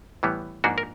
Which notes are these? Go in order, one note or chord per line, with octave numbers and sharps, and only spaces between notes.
A2 E3 G3 B3
G#2 F3 A#3 D4 F#4
A#4